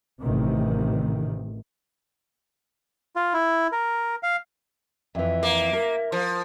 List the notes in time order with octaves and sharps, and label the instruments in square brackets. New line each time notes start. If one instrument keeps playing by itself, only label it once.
[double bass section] A1 C3 D#3
[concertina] F4
E4
A#4
F5
[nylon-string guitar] F2 E3 [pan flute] E5
[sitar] A#3
[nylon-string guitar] A#4
[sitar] F3